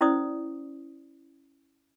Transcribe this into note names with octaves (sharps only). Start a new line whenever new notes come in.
C#4 E4 C5 D5 D#6